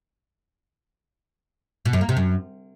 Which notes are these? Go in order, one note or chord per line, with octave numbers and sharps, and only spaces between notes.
B2
F#2
A#3
C3
F#2